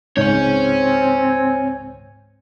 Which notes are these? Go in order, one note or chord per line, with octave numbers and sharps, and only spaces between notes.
C#2 G#2 C4 C#5 G#5 G6